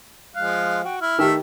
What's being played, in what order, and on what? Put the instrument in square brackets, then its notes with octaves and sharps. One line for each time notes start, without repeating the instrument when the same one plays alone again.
[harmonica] F3 G#3 F5 [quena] F#6
[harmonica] F#4 [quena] G5
[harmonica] E4 [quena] F6
[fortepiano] D#3 G4 [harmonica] A3 E5